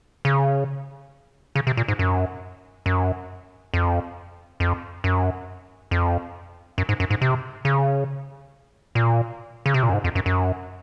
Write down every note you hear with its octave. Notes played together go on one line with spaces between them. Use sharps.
C#3
C#3
C3
A#2
G#2
F#2
F#2
F2
F2
F#2
F2
F#2
G#2
F#2
G#2
C3
C#3
A#2
C#3
C3
A#2
F#2
G#2
F2
F#2
F#2